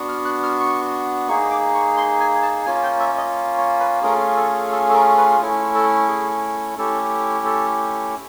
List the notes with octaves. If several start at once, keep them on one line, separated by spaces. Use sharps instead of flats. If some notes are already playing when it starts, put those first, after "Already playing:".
Already playing: B3 D4 F#4
F6
F#6
F6
C#6
A#3 D#4 G#4 C#6
D6
C#6
C6
G#5
A5
A#3 C#4 F4 G#5
G5
E5
D#5
C#5
B4
A3 C#4 F4 G#4 A#4
A4
A4
A4
A#4
B4
A3 C#4 E4
A4
G#4
A3 C#4 E4 G4 A4
A4